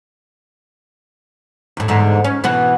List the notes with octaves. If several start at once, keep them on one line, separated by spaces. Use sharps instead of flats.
D#2 A2
E2 G#2 D3
C#4
B2 E3 B3